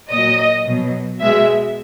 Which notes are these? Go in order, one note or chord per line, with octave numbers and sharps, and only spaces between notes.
A#2 F#3 D#5
B2 F#3
B2 G#3 E5